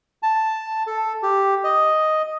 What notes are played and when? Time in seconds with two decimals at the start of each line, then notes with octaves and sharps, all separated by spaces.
0.23 A5
0.87 A4
1.23 G4
1.64 D#5